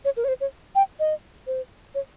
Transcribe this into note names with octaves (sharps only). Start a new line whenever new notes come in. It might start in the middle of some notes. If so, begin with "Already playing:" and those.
C#5
A#4
C#5
C5
C#5
G5
D#5
C5
C#5